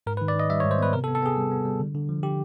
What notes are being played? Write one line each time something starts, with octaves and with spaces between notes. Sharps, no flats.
G#2 A#4
B4
D#3
D5
D#3 D#5
G3 E5
C#5
G#2
C5
B3 B4
C3 A#4
A4
B3
A4
B3 G#4
G3
B3
G3
D3
D3
F3
D3 G4